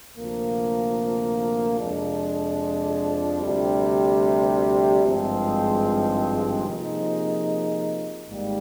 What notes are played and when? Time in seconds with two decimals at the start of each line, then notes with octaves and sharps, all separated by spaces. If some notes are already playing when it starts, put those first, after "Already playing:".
0.16 D2 C3 F3 A#3
1.79 F2 C3 F3 G#3 D4
3.41 D2 C3 G3
5.04 G#1 G2 F3 G#3 C4
6.66 C3 F3 A#3 D#4 G#4
8.28 G#1 G#2 G3 A#3